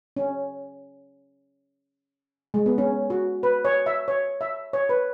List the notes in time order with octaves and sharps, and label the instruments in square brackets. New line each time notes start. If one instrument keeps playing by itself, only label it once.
[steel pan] C#4
G#3
B3
C#4
F#4
B4
C#5
E5
C#5
E5
C#5
B4